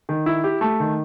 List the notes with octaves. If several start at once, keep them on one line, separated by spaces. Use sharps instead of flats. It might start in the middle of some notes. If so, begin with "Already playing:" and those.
D#3
E4
G4
A3
D#3